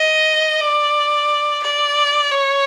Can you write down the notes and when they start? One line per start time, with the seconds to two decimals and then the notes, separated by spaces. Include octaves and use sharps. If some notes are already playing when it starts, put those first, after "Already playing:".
Already playing: D#5
0.60 D5
1.63 D5
2.31 C#5